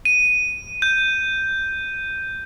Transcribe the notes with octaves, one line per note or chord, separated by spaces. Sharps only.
D#7
G6